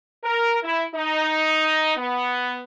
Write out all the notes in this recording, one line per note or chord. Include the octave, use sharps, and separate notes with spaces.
A#4
E4
D#4
B3